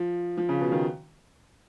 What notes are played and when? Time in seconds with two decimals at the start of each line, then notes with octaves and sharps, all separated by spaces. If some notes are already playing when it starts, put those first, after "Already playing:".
Already playing: F3
0.37 F3
0.49 C#3
0.61 B2
0.72 D#3